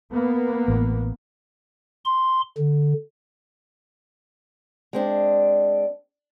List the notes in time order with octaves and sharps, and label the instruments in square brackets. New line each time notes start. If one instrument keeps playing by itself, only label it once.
[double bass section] A#3 B3
[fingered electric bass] A1 A2
[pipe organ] C6
D3
[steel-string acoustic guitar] G#3 C4 D4